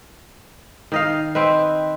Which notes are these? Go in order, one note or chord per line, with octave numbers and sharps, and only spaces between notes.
D#3 D#5 F5
C4 B4 D#5 G5